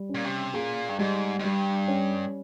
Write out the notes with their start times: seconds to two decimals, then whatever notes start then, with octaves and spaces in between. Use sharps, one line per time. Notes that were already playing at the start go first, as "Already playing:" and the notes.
Already playing: G3
0.09 C#4
0.15 A#2
0.24 C3
0.54 A#2 G#4
0.89 G2
0.99 G#2 G3
1.39 G#2
1.44 G2 G3
1.88 C#4